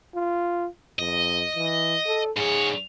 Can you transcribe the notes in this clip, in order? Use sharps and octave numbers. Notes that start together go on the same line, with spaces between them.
F4
F2 D#5
E3
A4
G#2 G#4 C#5